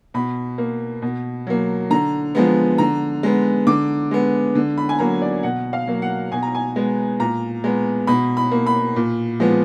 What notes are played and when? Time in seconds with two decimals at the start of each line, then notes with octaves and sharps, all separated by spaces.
0.14 B2 B5
0.58 A#3
1.02 B2
1.47 F#3 A#3
1.90 D3 A#5
2.35 F3 G#3 B3
2.78 D3 A#5
3.23 G#3 B3
3.67 D3 D6
4.11 G#3 B3
4.55 D3
4.78 B5
4.89 G#5
4.99 F#3 A#3 A#5
5.22 D5
5.43 B2 F#5
5.73 F5
5.87 F#3 A#3
6.02 F#5
6.32 B2 G#5
6.43 A#5
6.55 G#5
6.76 G#3 B3
7.19 A#2 A#5
7.64 G#3 B3
8.07 B2 B5
8.37 B5
8.51 A#3
8.66 B5
8.96 A#2
9.40 F3 G#3 B3